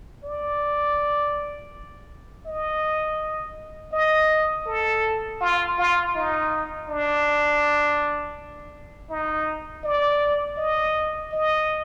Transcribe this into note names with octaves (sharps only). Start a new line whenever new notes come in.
D5
D#5
D#5
A4
F4
F4
D#4
D4
D#4
D5
D#5
D#5